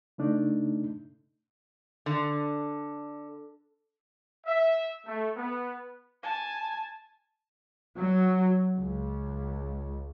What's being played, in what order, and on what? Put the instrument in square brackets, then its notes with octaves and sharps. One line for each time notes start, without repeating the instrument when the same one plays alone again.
[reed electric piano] C#3 A3 D4 D#4
[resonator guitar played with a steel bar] D3
[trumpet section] E5
A3
B3
[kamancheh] G#5 A5
[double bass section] F#3
C#2